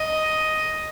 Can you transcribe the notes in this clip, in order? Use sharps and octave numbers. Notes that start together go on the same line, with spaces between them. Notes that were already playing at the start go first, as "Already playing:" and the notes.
Already playing: D#5